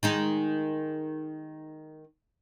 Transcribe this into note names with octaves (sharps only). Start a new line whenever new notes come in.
D#3 G#3 D#4